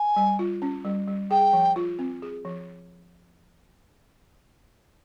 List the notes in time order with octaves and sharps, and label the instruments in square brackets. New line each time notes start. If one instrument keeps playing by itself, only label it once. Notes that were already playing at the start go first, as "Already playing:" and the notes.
Already playing: [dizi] G#5
[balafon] G3
F4
C#4
G3
G3
[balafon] G#4 [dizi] G5
[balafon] F3
F4
C4
G#4
F3